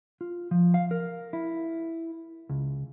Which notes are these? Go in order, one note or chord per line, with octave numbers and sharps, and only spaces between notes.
F4
F3
F5
A#4
E4
C#2